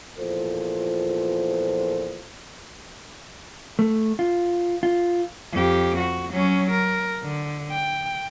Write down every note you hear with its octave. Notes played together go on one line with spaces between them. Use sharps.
E2 A#2 F3 A4 C5
A3
F4
F4
F2 G4
F#4
F#3 C#4
A#4
D3
G5